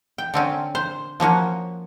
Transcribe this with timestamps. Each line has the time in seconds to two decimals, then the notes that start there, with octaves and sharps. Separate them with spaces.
0.18 G5
0.34 D3 C4 C#4
0.75 C5
1.20 F3 A#3 C#4 F#4